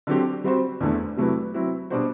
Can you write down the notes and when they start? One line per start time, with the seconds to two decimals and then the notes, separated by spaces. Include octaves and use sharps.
0.07 D3 F#3 C4 G4
0.44 G3 C4 F#4 C5
0.80 E2 D3 A3
1.17 C3 F#3 A3 E4 B4
1.54 F#3 C4 E4
1.90 B2 G3 D4 F#4 C5